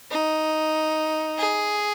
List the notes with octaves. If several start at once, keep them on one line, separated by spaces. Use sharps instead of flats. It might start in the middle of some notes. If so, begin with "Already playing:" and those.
D#4
G#4